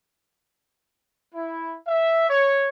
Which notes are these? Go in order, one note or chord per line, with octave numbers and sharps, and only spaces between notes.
E4
E5
C#5